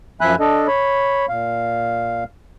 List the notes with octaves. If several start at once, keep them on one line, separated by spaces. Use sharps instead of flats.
F#2 F3 E5 G#5 B5 F#6
D4 A4 D#5
C#5 B5
A#2 F5